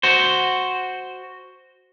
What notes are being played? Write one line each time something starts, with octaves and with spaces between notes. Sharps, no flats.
F#4 C5